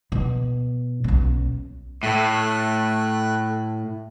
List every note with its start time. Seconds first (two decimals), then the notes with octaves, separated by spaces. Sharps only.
0.12 B2
1.04 B1 C#4
2.03 A2 A3 F#6